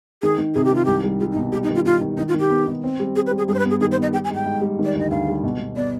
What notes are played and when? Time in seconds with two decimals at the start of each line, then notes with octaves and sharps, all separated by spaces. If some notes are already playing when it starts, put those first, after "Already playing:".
0.22 D#3 G#4
0.38 D#3
0.54 C3 G#4
0.65 G4
0.71 D#3 F4
0.85 C2 G4
1.04 G3
1.20 G3 F4
1.32 D#4
1.36 B2
1.52 G3 G4
1.63 D#4
1.69 D#3
1.75 F4
1.85 D#3 F4
2.01 D#3
2.17 D#3 D#4
2.28 F4
2.34 D#3
2.40 G4
2.50 B3
2.67 D#3
2.84 C4
3.00 G3
3.16 C4 G#4
3.27 B4
3.31 G3
3.38 G#4
3.48 G2 G#4
3.54 C5
3.59 B4
3.65 B3
3.70 G#4
3.80 D#3 G#4
3.92 C5
3.98 B3 D#5
4.13 G3 G5
4.24 G#5
4.30 G#2
4.35 G5
4.45 G#2
4.62 G3
4.79 D#3
4.85 D5
4.95 D2 D#5
5.10 D2 F5
5.27 G3
5.43 B2
5.60 B2
5.76 B3 D5